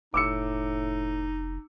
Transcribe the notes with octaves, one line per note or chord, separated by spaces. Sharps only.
F1 A2 D#4 D6 E6 C#7